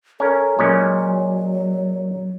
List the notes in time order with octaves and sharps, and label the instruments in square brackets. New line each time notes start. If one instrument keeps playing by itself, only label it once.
[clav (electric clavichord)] C#4 A#4 [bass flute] A4
[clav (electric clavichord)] A#2 G#3 C#4 [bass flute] F#3